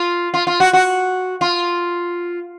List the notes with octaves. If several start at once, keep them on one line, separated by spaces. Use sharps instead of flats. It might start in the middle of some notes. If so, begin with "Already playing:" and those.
Already playing: F4
F4
F4
F#4
F#4
F4